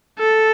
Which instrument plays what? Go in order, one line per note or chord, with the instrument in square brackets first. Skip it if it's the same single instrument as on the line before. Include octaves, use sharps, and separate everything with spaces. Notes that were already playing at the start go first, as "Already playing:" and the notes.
[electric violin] A4